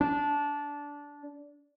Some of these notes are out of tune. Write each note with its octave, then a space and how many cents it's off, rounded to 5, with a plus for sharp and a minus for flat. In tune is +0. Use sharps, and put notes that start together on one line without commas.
D4 -15